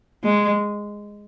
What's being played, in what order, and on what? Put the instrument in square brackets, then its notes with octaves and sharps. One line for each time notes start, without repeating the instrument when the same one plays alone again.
[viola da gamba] G#3